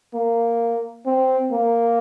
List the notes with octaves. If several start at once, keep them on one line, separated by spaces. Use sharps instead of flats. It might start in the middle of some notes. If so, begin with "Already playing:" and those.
A#3
C4
A#3